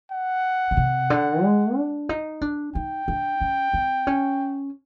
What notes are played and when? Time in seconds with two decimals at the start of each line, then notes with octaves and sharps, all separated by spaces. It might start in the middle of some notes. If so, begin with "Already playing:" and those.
0.12 F#5
0.71 B2
0.77 C3
1.10 D3
1.43 G#3
1.76 D4
2.09 D#4
2.41 D4
2.75 D#4 G5
3.08 D4
3.41 C#4
3.73 C4
4.07 C#4